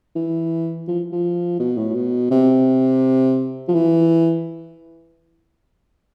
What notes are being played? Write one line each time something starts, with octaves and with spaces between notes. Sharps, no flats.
E3
F3
F3
B2
A2
B2
C3
F3
E3